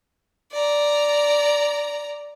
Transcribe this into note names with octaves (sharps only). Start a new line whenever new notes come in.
D5 A#5